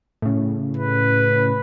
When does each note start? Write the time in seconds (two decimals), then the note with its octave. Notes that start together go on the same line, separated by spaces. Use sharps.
0.22 A2 C#3
0.77 B4